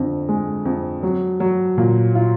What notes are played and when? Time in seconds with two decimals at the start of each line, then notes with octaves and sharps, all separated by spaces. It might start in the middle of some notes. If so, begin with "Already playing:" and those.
Already playing: F2 D3
0.29 G#3
0.65 F2
1.03 F#3
1.40 F#3
1.78 A#2
2.15 F4